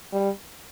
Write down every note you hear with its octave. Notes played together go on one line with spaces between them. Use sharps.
G3